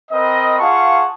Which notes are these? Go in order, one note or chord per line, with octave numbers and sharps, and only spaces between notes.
C4 A#4 B4 D#5
F4 G#4 F5 F#5 A5 C#6